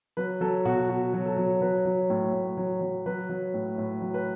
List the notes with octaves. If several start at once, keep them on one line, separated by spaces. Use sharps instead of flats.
F#3 B4
F#3 A4
B2 F#4
B2 F#4
F#3
A4
F#3
F#3 B4
F#3
A2
A2
F#3
F#3
F#3 B4
F#3
A2
A2
F#3
B4